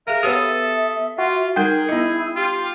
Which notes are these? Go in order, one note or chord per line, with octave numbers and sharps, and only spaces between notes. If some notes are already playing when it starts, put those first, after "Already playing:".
G#4 A#4 E5 F5
B3 G4 A4 B4 C#5 D#6
F4 F#4
G3 D#4 G#4 A#4 F#5 G5 G6
B3 E4 D#5
F4 G4